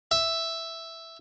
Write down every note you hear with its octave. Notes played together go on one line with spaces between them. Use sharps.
E5